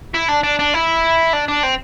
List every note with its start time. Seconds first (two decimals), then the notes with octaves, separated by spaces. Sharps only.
0.14 E4
0.28 D4
0.43 D4
0.59 D4
0.74 E4
1.33 D4
1.48 D4
1.63 C4